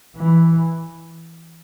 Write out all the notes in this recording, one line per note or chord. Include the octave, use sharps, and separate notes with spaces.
E3